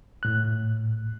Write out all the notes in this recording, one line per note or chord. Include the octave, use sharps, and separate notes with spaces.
A2 F#6